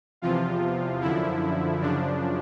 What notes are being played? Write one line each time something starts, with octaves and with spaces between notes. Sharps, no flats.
E2 C3 F3 F4
F#2 D3 F3 E4
F#2 C#3 F3 D4